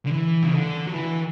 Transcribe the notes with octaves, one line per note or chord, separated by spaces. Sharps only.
D3
E3
C#3
D3
F#3
E3